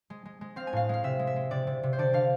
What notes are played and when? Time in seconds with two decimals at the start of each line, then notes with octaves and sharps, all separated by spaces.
0.10 G#3
0.25 G#3
0.41 G#3
0.56 C4 F5
0.67 G#5
0.73 A2 F5
0.89 G#3 F5
1.04 C3 E5
1.19 G#3
1.27 E5
1.36 G#3
1.51 C3 D5
1.67 C3
1.83 C3
1.93 C5
1.98 D3 D5
2.14 D3 F5